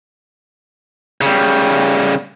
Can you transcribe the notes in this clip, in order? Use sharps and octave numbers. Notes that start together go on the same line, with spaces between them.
C#3 G3